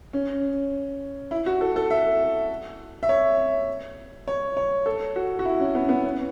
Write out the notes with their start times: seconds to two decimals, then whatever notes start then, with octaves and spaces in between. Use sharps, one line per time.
0.13 C#4
1.31 E4
1.46 F#4
1.61 A4
1.76 A4
1.91 E5
3.03 E5
3.09 C#5
4.28 C#5
4.57 C#5
4.86 A4
5.16 F#4
5.39 F#4
5.45 E4
5.60 C#4
5.75 B3
5.89 B3
6.04 C#4